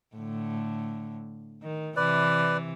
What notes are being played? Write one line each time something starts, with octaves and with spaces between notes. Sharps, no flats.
A2 D3
D#3
C3 E3 B4 D5